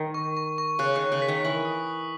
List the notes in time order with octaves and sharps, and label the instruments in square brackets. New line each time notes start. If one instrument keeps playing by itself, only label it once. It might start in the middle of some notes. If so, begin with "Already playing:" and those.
Already playing: [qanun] D#3
[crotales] C#6
C#6
C#6
[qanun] C#3 [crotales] F#6
[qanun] D#3
[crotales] F#6
[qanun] C#3
[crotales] B6
[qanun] D#3
[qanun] E3 [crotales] F#7
[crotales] D#6